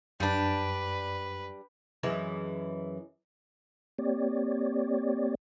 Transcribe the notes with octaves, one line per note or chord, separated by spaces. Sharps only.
F#2 G3 D4 B4
F#2 E3 G#3
A#3 C4 G4 C#5 D5